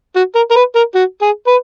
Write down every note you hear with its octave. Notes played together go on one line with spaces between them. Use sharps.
F#4
A#4
A#4
B4
A#4
F#4
G#4
B4